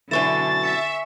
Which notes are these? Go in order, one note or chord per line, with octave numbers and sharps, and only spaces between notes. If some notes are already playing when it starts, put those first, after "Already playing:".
F#2 B2 D3 E4 G#5 C#6 A6 E7
E5 C#7